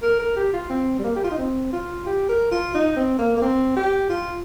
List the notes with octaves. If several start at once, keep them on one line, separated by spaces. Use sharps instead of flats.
A#4
A#4
G4
F4
C4
G3
A#3
G4
F4
D#4
C4
F4
G4
A#4
F4
D#4
C4
A#3
A#3
C4
G4
F4